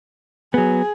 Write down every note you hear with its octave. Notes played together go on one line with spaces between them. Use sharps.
F#3 B3 G#4